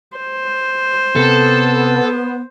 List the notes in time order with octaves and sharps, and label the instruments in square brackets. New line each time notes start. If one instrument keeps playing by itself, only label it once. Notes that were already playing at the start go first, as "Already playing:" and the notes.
[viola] C5
[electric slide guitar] C3 C4 A#4 [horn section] B3 [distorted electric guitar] A4